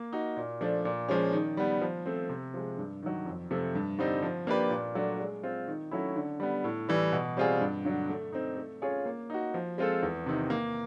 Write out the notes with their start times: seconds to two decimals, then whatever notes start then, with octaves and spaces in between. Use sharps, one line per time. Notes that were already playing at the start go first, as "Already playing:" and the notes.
Already playing: A#3
0.13 D#4 F#4
0.37 A#2
0.61 F3 A3 D4
0.85 A#2
1.09 F3 G#3 C#4
1.33 D#3
1.57 G3 B3
1.81 F3
2.06 A3 C4
2.29 C3
2.54 F3 G#3
2.78 G2
3.03 D#3 F#3
3.26 F2
3.51 C3 F3 A3
3.75 G2
3.99 D3 G3 C4 D#4
4.23 F3
4.47 A#3 D4 G4 B4
4.70 A#2
4.95 F#3 A3 D4
5.19 G#3
5.43 C4 F4
5.68 D#3
5.91 F#3 A3 C#4 E4
6.16 D3
6.40 G3 B3
6.64 A2
6.89 E3 G3
7.13 B2
7.37 G3 C4 F4 G#4
7.61 G2
7.85 D3 F#3
8.09 A3
8.33 C4 D#4
8.57 A3
8.82 C#4 F4 G#4 C#5
9.06 A#3
9.30 D#4 F#4
9.54 F3
9.78 G#3 C4 F4 A4
10.03 E2
10.26 C3 D#3
10.50 A#3